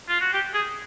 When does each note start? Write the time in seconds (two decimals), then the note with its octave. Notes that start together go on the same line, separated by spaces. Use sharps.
0.09 F4
0.21 F#4
0.33 G4
0.54 G#4